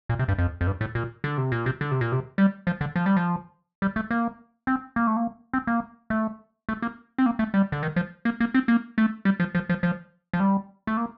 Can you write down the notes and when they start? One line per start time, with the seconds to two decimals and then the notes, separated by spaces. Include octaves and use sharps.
0.09 A#2
0.19 C3
0.28 G2
0.38 F2
0.61 F2
0.67 G2
0.81 A2
0.95 A#2
1.24 D3
1.38 C3
1.52 A#2
1.66 C3
1.81 D3
1.92 C3
2.01 A#2
2.12 C3
2.38 G3
2.67 F3
2.81 D3
2.96 F3
3.06 G3
3.17 F3
3.82 G3
3.96 A3
4.11 A#3
4.67 C4
4.96 A#3
5.07 A3
5.16 A#3
5.53 C4
5.67 A#3
6.10 A3
6.69 A3
6.82 A#3
7.18 C4
7.26 A#3
7.39 A3
7.54 G3
7.72 D3
7.83 D#3
7.96 F3
8.25 A#3
8.40 A#3
8.54 C4
8.68 A#3
8.98 A3
9.25 G3
9.40 F3
9.55 F3
9.69 F3
9.83 F3
10.33 F3
10.40 G3
10.87 A3
10.97 A#3